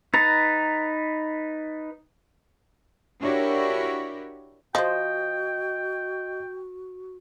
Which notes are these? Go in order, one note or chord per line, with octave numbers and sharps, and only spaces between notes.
D#4 B4 A#5 A6
D4 E4 F#4 G4 A#4 C#5
F3 F#4 C5 D#5 G5